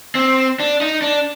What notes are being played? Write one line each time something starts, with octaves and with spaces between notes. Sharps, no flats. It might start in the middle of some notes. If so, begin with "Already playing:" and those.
C4
D4
D#4
D4